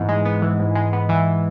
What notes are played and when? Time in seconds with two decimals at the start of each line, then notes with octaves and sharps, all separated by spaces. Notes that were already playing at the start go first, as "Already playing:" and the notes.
Already playing: G#2 E3 B3
0.09 G#3
0.25 B3
0.42 E3
0.59 G#2
0.75 G#3
0.93 B3
1.09 E3